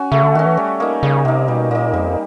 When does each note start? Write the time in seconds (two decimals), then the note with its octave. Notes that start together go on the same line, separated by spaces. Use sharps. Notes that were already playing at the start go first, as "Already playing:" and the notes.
Already playing: C#4 F#4
0.12 C#3 A3
0.23 D3
0.35 D#3 C#4 F#4
0.46 E3
0.57 G3
0.80 A#3 D#4
1.03 C#3 G3
1.25 C3 A#3 D#4
1.48 B2 G3
1.70 A#2 A#3 D#4
1.93 F2 G3